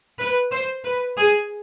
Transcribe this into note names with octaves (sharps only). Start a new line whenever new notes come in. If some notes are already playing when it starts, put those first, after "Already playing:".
B4
C5
B4
G#4